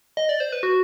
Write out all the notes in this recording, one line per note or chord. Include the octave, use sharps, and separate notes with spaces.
D#5
D5
C5
B4
F#4